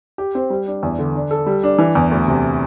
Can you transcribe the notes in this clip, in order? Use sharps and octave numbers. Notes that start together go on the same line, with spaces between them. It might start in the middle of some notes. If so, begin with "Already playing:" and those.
G4
C4
G3
D4
E2
D3
D4
A4
G3
D4
E3
E2
D2
C3